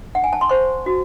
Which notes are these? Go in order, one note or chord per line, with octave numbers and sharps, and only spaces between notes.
F#5
G#5
A5
C6
C5 C#6
F#4